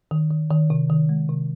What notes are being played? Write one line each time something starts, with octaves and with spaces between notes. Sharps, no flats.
D#3
D#3
D#3
C3
D#3
G#3
C3